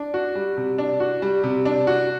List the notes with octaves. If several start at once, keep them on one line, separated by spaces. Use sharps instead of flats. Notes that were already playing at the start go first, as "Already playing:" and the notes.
Already playing: D4
F#4
G3
C3
D4
F#4
G3
C3
D4
F#4